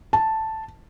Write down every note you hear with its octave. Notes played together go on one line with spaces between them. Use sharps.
A5